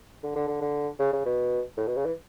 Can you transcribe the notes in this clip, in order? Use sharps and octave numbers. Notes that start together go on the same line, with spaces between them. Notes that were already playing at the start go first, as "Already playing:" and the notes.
D3
D3
D3
D3
C#3
C#3
B2
A2
B2
C#3
E3